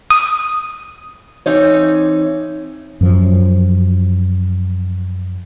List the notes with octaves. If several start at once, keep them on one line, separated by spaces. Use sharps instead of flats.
D#6
E3 C4 D#4 C#5
F#2 F3